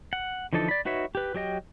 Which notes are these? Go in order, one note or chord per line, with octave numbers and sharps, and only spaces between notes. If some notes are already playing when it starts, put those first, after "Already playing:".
F#5
D3 E3 F3 D#4 A4
D5 B5
D#4 F#4 B4 C#5 E5
G4 B4
F#3 G4 D#5 G5